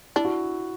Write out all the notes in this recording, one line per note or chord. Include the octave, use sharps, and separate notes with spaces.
D4 E4
F#4